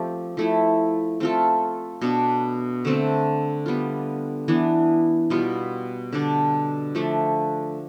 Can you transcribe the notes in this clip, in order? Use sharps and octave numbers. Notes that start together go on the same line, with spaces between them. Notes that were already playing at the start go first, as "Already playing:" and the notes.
Already playing: F3 A3 C4 G4
F3 A3 E4
A3 C4 F4 A4
B2 B3 D4
D3 A3 C4
G3 B3 F4
E3 B3 D4
B2 G3 B3 F4
D3 G3 D4
F3 A3 D4